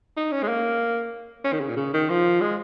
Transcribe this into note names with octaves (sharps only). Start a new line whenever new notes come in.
D#4
C#4
G#3
A#3
C#4
D#3
C#3
A#2
C#3
D#3
F3
G#3